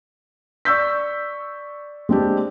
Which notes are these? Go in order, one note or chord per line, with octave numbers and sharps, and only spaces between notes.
D5 C#6 E6 G6 B6
G#3 C4 D4 G4